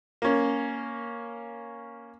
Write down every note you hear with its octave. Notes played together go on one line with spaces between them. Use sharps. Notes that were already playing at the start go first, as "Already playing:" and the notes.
A#3 C#4